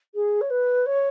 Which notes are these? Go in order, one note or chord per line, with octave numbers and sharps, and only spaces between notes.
G#4
C#5
B4
C#5